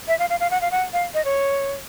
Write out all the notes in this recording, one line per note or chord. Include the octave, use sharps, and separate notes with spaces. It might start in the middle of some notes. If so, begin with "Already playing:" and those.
E5
F5
F5
F5
F#5
F5
F#5
F5
D#5
C#5